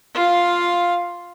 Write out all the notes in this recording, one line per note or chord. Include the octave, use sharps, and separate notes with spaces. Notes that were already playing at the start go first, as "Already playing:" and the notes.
F4 F5